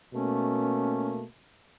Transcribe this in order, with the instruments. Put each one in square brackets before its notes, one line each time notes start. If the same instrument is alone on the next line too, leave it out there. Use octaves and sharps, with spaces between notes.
[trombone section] B2 A3 A#3 [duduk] C#4